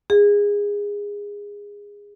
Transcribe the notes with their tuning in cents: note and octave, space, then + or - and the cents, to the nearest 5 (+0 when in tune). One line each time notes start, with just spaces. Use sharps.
G#4 -20